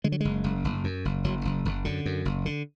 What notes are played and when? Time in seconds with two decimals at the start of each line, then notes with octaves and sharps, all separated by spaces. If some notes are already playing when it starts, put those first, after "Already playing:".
0.04 D3 G#3
0.12 F#3
0.21 F#1 G#3
0.44 F#1
0.64 F#1
0.84 F#2
1.05 F#1
1.24 F#1 F#3
1.45 F#1
1.65 F#1
1.85 F#2 D3
2.06 F#2
2.25 F#1
2.46 D3